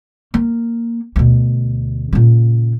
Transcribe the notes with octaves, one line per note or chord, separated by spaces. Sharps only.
A#3
D2 B2
A#2 C#3